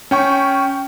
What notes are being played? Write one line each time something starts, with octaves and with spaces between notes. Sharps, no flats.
C#4 G5 C#6